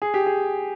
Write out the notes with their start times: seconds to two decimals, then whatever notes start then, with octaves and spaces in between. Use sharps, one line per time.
0.02 G#4
0.14 G4
0.26 G#4